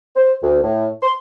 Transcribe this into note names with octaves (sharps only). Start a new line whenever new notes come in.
C5
D2
A2
C6